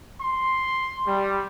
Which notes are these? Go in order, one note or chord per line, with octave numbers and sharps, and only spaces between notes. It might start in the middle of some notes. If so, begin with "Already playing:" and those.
C6
G3